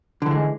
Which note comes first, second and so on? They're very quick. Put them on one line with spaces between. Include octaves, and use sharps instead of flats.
D3 E3 G#3